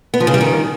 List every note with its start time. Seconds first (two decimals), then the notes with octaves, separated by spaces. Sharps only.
0.14 B3
0.20 F3
0.27 C#3
0.34 G3
0.41 D#3